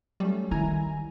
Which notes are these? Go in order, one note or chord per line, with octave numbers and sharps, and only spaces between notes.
F#3 G3 A3 C#4
D#3 E4 G#5 A#5